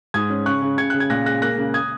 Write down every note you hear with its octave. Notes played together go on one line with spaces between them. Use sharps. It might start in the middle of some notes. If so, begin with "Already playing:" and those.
G#2 D#6 G#6
C#4
C#3 C#6 F#6
C#3
C#3 G#6 C#7
C#3 F#6
G#6
A#2 F#6 A#6
G#3 F#6 A#6
A#3 F#6 A#6
C#3
D#6 G#6